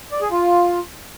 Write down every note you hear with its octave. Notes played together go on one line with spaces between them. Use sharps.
D5
G#4
F4